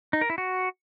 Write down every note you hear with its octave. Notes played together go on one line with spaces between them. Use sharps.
D#4
A#4
E4
F#4